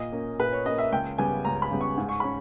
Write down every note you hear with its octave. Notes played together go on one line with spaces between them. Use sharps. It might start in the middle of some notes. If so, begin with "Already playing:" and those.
Already playing: A#2 D#5
A#3 C#4
A#2 B4
C#5
A#3 C#4 D#5
E5
C#2 G5
C#3 G3 B3 G#5
C#2 A#5
B5
C#3 G3 B3
C#6
G#2
C#6
C#4 B5